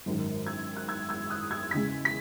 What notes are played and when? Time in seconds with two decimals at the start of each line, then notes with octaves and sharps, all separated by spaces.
0.06 G#1 F#2 D#3
0.47 E6 G#6
0.77 F#6
0.88 E6 G#6
1.09 E6 G#6
1.30 D#6 F#6
1.51 E6 G#6
1.71 E2 C#3 G#3 G#6 B6
2.05 B6